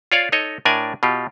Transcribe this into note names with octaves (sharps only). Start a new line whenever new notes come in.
F4 C#5 D5 F5
D#4 A4 C#5 D#5
A2 D4 A#4 D5 G#5
B2 F4 G4